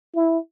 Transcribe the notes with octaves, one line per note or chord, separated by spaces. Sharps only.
E4